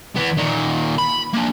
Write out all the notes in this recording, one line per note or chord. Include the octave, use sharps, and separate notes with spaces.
E3 B3
A#2 D#3
B5
A#3 D4